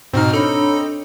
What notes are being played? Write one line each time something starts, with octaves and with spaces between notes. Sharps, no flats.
G#2 B2 C4 D#4 F6
D4 A4 C#5 B5